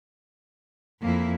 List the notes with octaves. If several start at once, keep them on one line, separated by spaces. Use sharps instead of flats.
F2 A#3 E4